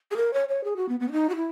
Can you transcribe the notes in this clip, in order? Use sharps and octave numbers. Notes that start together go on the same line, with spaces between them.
G#4
A#4
C#5
C#5
G#4
F#4
B3
B3
C#4
D#4
F#4
E4